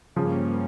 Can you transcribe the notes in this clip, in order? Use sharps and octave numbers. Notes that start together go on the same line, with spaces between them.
G2 C#3 F3 G3 A#3 C#4